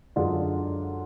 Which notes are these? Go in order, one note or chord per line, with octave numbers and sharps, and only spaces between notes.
F#2 D3 G#3 D4 F4